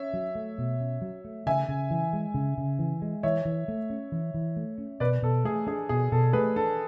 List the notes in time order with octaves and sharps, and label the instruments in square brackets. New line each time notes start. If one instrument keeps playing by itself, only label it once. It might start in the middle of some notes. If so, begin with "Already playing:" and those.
Already playing: [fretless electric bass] C#4 [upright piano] C#5 E5
[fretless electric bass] F#3
A3
B2
C#4
F#3
A3
[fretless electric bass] C#3 [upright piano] E5 G#5
[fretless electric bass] C#3
E3
G#3
C#3
C#3
E3
G#3
[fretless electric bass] E3 [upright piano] C#5 E5
[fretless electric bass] E3
A3
C#4
E3
E3
A3
C#4
[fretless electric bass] B2 [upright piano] B4 D5
[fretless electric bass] B2 [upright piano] A4
[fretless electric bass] A3 [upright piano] G#4
[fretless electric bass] D4 [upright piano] G#4
[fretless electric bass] B2 [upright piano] G#4
[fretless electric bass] B2 [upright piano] A4
[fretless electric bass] A3 [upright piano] G#4 B4
[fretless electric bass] D4 [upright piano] A4